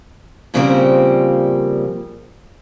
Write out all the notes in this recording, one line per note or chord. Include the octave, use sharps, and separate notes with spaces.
A#2 C#3 F3 G3 A#3 C4